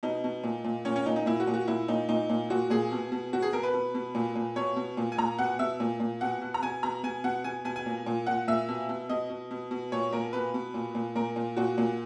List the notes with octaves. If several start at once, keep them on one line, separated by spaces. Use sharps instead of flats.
B2 D#4
B2
A#2
A#2
A#2 C#4
C#4
A#2 D#4
D#4
A#2 E4
F#4
A#2
F#4
A#2 E4
A#2 D#4
A#2 D#4
A#2
A#2 F#4
A#2 G#4
B2
B2
B2 F#4
G#4
B2 A#4
B4
B2
B2
A#2
A#2
B2 C#5
B2
A#2
G#5
A#2 A#5
B2 F#5
B2 E5
A#2
A#2
B2 F#5
B2
A#5
B2 G#5
B2 A#5
B2 G#5
B2 F#5
B2 G#5
B2 G#5
G#5
A#2
A#2
A#2 F#5
A#2 E5
B2
B2
B2 D#5
B2
B2
B2
A#2 C#5
A#2 A#4
B2 B4
B2
A#2
A#2
A#2 A#4
A#2
A#2 F#4
A#2